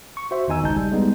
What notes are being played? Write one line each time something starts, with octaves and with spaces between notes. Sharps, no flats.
C#6
F#4 C5 E5
E2 D#3 D#4 G#5 E6
G#1 C#2 D#4 A5 G6
G3
G3 G#3 B3 D#4